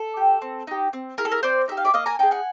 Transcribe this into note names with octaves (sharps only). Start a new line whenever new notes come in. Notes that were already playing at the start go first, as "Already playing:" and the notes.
Already playing: A4
G4
C4
D#4 G4
C4
E4 G#4 A#4
A4
A#4
C4 C5 D5
D#4 G4 E5
F5
D5 E5
A#3 D#5 F5
G#5 A#5
D#4 G#4 G5 A5
F#5 G#5